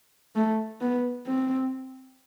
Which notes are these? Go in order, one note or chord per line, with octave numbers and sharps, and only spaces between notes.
A3
B3
C4